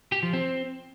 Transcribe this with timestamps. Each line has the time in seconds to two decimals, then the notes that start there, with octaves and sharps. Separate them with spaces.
0.12 G4
0.23 F3
0.33 C4